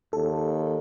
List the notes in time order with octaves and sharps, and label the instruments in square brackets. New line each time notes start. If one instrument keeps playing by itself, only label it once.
[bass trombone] D#2 [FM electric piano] A4